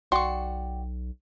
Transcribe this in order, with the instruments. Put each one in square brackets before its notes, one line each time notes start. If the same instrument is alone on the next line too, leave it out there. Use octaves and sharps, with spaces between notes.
[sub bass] B1 [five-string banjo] F#4 D5 [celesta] G5 [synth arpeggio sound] C6 C#6